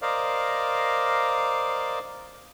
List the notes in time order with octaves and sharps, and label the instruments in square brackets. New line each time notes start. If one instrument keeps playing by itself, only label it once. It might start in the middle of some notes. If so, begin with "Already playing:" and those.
[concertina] A#4 C5 D5 D#5 F5